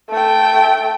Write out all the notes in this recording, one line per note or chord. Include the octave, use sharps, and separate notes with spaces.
A3 G5